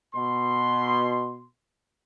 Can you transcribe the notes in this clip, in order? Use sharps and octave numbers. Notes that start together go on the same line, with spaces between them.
B2 C6